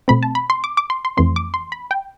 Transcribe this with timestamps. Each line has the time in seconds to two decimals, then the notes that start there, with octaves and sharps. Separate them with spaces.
0.08 B2 A3 C4 B5
0.23 A5
0.35 B5
0.50 C6
0.64 D6
0.77 D6
0.90 C6
1.05 C6
1.17 F2 E3 A3 C4 C6
1.36 D6
1.54 C6
1.72 B5
1.91 G5